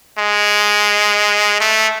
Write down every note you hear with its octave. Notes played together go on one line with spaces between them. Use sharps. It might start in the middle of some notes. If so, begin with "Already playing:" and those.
G#3
A3